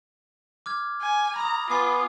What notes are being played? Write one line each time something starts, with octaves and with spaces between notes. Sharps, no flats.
D6 F6 G#6
G#5
A#5 B5 D#6
B3 F4 G#5 D6 C7